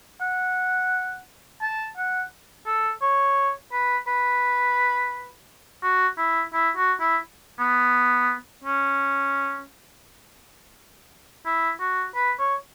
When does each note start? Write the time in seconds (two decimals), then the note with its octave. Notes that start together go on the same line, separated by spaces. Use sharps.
0.21 F#5
1.62 A5
1.97 F#5
2.66 A4
3.02 C#5
3.73 B4
4.08 B4
5.83 F#4
6.18 E4
6.53 E4
6.77 F#4
7.00 E4
7.59 B3
8.64 C#4
11.46 E4
11.80 F#4
12.15 B4
12.39 C#5